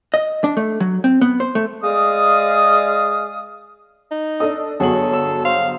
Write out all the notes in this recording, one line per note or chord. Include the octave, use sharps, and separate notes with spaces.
D#5
D4
A3
F#3
C4
B3
C5
A3
G#3 D5 F5 D#6
D#4
D4 A4 D#5
G1 F#3 G#4 A4 C#5 F#5 F#7
E6
C5 F5